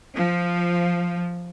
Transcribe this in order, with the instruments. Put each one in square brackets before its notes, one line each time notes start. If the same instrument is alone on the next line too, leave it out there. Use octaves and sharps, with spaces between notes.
[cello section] F3